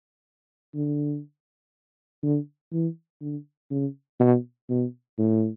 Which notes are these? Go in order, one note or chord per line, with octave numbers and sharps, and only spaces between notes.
D3
D3
E3
D3
C#3
B2
B2
A2